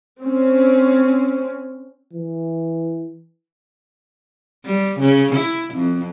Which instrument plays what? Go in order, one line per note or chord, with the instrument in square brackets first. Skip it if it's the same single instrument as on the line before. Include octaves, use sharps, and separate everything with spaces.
[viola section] C4 C#4
[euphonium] E3
[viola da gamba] G3
C#3
E4
F2